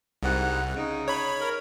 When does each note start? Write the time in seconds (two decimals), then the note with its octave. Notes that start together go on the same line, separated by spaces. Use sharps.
0.23 C2 G#2 C3 F#5
0.76 C#3 D#4
1.08 C#5 B5
1.40 A#4